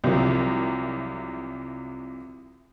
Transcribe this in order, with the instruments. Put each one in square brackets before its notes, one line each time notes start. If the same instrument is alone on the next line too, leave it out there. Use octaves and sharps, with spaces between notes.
[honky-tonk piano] C2 C3 F3 F#3